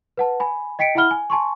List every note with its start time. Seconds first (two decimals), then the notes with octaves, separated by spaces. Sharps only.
0.17 B4 F#5 A5
0.40 G#5 B5
0.79 D#5 G5 B6 C#7 D7
0.95 E4 E5 F#5 B5 F6 G7
1.11 G#5
1.30 G#5 A5 C6 C#6